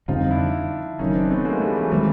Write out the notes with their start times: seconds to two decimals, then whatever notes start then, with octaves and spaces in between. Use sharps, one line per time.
0.08 F2 D3 G3 C4 D#4 F4
0.31 D4 E4
0.99 F#1 F#2 D#3 C#4 D#4
1.15 C4 D4
1.30 A3 B3
1.45 G#3 A#3
1.61 G3 A3
1.76 E3 F#3
1.92 D#3 F3 G3 G#3 C4